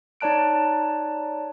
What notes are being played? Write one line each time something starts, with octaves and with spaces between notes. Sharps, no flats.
D#4 C#5 D5 A5 F#6 D7